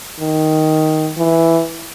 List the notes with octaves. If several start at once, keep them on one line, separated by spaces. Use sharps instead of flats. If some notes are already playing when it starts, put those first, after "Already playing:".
D#3
E3